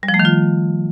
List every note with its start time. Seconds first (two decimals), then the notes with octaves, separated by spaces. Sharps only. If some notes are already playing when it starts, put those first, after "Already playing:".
0.03 G3
0.08 F3
0.14 A3
0.19 D#3
0.25 F4